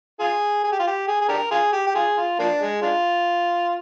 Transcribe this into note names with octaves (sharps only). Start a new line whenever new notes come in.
F4 G#4
G#4
G4
F4
G4
G#4
G#4
D4 G4 A#4
F4 G#4
G4
G4
F4 G#4
F4
F3 A#3 D4
G#3
G#3 D4 F4